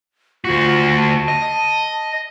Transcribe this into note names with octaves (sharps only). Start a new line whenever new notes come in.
D2 F4 F#4
A5
D#5